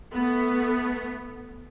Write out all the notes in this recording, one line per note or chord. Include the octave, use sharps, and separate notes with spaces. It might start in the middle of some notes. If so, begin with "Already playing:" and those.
A3 B3